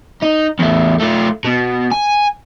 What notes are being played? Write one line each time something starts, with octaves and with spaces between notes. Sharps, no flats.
D#4
E2 A3
A3 F4
B2
G#5